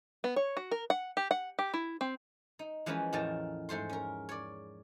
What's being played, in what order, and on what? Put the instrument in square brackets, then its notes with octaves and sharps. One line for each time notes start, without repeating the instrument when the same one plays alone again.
[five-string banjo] B3
C#5
F#4
A#4
F#5
G4
F#5
G4
E4
C4
[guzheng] D#4
E3 F3 G#3 C#4 A#4 B4
E2 A2 F3 D#4 A#4 A5
G#2 A3 C5 C6
C#4 A#4
C#5 D5